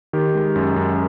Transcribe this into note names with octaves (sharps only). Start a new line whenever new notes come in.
D#3 G4
G#3
F#2
F#2